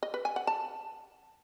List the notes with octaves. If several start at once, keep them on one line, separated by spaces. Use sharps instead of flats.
D#5
B4
G#5
F#5
A5